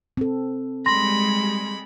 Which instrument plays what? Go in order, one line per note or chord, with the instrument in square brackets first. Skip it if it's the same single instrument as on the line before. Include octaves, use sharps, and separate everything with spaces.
[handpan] C4 A4
[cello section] G3 G#3 [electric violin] B5 [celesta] C6 A#6